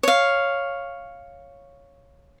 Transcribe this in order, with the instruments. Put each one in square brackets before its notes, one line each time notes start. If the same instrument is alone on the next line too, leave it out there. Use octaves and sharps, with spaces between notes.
[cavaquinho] C#5 F5